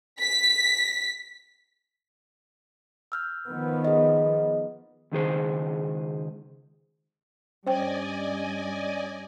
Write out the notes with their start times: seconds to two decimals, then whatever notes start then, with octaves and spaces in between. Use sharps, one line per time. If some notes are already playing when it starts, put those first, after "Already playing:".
0.20 B6
3.12 E6 F6 G6
3.45 D#3 F3 B3
3.85 G#4 D#5
5.12 C#2 D#3 G#4 C5
7.67 G2 G3 C#4 C5 D5 D#5 G5 G#5